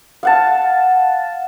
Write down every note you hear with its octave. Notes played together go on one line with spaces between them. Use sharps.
F5 F#5 A5